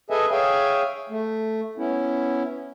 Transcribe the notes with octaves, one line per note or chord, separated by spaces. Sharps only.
G#4 A4 B4 D#5 E5 G#5
G#4 C#5 E5 F5 G5 G#5
A3
B3 C#4 E4